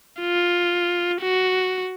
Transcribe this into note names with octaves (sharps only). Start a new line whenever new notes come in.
F4
F#4